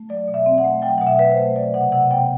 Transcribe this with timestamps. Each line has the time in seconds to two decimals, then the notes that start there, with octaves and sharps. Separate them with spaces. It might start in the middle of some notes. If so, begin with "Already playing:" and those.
Already playing: A3
0.09 F#3 D5
0.28 B2
0.34 E5
0.46 C4
0.58 F#5
0.64 A3
0.82 F#3 G5
0.98 B2 F#5
1.07 E5
1.19 C4 B4
1.32 C5
1.37 A3
1.56 F#3 D5
1.74 C3 F#5
1.92 C3 F#5
2.11 B3 G5